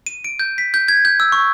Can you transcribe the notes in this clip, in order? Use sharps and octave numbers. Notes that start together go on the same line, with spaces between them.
D#7
D7
G6
B6
G6
G#6
G6
E6
C#6